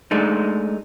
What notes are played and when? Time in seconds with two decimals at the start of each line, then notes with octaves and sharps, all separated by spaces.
0.11 G#3 A3 D4 D#4